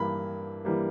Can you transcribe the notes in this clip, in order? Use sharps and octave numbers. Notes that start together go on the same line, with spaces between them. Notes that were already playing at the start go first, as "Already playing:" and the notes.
Already playing: G2 E3 G3 A#3 B5
E3 G3 A#3